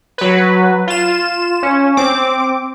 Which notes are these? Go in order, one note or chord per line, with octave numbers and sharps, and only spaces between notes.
F#3 B4
F4 E7
C#4
C4 D6